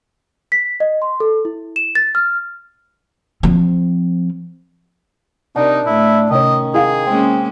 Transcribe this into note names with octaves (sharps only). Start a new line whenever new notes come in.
B6
D#5
C6
A4
E4
E7
A6
F6
F3 C4
C3 D4 D#4 A#4 D5
A2 A3 E4
C3 D#3 C#4 C#5 D#5
E4 G#4 F5 F#5
G#3 A#3 C4 C#4